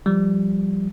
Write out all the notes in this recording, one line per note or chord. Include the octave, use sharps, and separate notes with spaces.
F3 G3